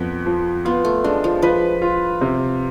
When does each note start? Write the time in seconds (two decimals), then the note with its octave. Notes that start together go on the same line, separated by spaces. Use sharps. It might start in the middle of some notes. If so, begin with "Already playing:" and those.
Already playing: F2 B3
0.26 F3
0.65 B3 F4
0.85 A3
1.04 G#3 D4
1.24 F3
1.42 F3 B4
1.82 F4
2.21 C3